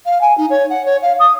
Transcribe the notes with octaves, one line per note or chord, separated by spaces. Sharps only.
F5
G#5
D#4
C#5
F#5
C#5
F5
D#6